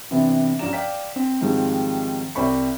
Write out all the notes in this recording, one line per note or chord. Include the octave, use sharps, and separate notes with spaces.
C3 E3 B3 C4 D4
G2 F3 C#4 D5 A#5 E7
D5 F5 G5 B6
C4
G#2 D#3 F3 G3 G#3 C4
C2 C4 C5 D5 B5 C#6